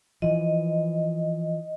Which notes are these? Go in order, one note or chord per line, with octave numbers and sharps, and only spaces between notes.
E3 F3 D#5